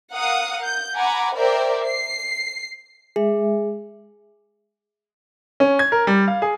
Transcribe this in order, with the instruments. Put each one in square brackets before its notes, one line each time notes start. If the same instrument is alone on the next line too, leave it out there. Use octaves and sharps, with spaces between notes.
[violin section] A#4 F5 F#5 D#6
G6
F#5 G#5 A#5 B5 D6
A#4 C5 D5 E5 G5
C7
[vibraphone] G#3 E5 [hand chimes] G#4
[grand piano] C#4
G#6
A#4
G3
F5
G#4